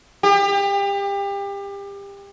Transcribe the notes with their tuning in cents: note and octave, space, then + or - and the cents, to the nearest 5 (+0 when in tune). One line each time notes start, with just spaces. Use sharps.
G4 +30